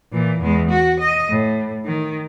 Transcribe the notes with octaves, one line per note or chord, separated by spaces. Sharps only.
A#2 E3
E2 G#3
F#4
D#5
A2
D#3